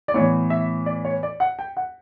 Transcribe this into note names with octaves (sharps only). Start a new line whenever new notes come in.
D5
A2 E3 B3 C#5
E5
D5
C#5
D5
F#5
G5
F#5